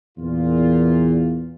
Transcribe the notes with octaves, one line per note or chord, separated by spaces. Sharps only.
E2 A#2 F4